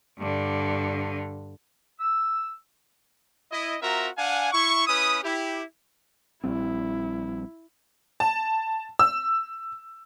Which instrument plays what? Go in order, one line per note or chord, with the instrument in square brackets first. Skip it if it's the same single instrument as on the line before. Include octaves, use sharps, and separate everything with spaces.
[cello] G2 D3
[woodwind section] E6
[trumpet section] E4 D#5
C4 F4 F#4 A#4 E5 A#5
D4 F5 F#5 G#5
E4 C#6
C#4 E4 B4 E5 D#6
E4 G4
[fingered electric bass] A#1 G3 C4 [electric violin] E4
[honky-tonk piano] A5
E6